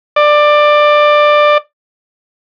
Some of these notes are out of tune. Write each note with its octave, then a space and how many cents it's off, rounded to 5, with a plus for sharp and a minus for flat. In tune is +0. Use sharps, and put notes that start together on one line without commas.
D5 +15